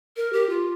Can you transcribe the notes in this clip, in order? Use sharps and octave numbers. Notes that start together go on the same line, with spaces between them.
A#4
G4
F4